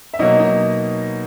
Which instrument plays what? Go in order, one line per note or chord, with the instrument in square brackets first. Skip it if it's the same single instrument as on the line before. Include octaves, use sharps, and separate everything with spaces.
[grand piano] E5
B2 F#3 A#3 D#4 D#5
D#4 D#5